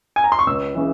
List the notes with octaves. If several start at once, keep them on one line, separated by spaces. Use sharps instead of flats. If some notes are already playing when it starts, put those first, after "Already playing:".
G#5
A#5
C6
C#6
C#2 E6
C#3 E3